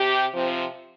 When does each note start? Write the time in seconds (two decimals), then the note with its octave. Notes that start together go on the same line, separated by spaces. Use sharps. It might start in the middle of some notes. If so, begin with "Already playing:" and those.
Already playing: C3 G4
0.33 C3 F3 C4